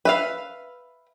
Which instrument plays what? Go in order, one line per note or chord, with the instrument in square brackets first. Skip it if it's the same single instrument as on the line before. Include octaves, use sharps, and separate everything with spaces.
[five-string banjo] B4 E5 F5